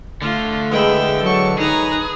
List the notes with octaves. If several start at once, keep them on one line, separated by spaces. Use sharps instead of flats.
D3 A3 F4
E2 G#3 E5 G5 B5
F#3 A4 C#6
D#4 G#4 B4 A#5